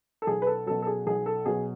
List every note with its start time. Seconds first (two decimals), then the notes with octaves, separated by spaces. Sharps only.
0.22 A4
0.27 B1 G#4
0.42 B4
0.47 A4
0.66 B2 F#3 A4
0.82 A4
0.87 G#4
1.07 B1 G#4
1.26 A4
1.46 B2 F#3 G#4